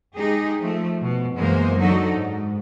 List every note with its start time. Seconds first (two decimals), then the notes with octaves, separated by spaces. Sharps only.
0.15 G#3 D#4 G4 G#4
0.61 F3 A3
1.02 B2
1.36 F#2 E3 G#3 A#3 B3 C5
1.79 D3 F#3 D#4 F#4 A4
2.14 G#2